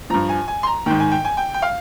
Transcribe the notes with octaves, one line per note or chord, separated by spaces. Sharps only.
G2 F3 A#5
G#5
G#5
C6
A#5
G#2 D#3 G5
G#5
G5
G#5
G5
G5
F5